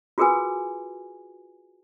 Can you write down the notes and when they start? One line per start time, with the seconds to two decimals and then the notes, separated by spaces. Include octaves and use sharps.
0.18 F4 F#4 G#4 A#4 B4 G#5